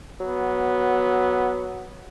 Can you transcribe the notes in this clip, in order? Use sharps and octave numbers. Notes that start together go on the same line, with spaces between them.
F#3 B3